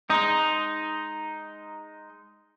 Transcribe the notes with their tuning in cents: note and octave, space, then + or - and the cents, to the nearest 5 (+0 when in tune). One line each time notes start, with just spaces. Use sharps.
G#3 +0 D#4 +0